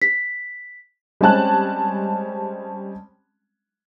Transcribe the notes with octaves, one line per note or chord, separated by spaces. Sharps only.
B6
G3 G#3 C4 C#4 A5 F#6